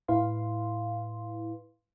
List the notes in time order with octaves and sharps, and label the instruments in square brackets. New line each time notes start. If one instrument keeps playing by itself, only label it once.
[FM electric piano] A2 E4 B4 F5 C6